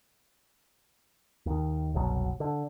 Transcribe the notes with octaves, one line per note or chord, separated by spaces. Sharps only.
D#2 D#3
F#1 C2 B2 F#3
D3